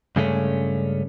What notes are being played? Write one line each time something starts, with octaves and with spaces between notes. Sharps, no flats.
G2 C#3 G#3 A3 C#4